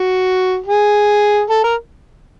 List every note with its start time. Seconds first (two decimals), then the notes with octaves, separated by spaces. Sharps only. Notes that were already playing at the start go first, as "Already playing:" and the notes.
Already playing: F#4
0.66 G#4
1.50 A4
1.64 A#4